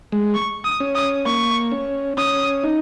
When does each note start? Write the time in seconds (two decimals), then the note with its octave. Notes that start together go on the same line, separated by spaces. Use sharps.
0.12 G#3
0.35 C#6
0.65 D#6
0.80 C#4
0.95 D#6
1.26 A#3 C#6
1.72 C#4
2.17 C#4 D#6
2.64 D#4